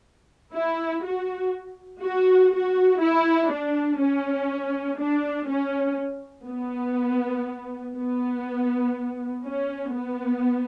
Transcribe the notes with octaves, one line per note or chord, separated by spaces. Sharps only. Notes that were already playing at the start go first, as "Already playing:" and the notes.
E4
F#4
F#4
F#4
E4
D4
C#4
D4
C#4
B3
B3
C#4
B3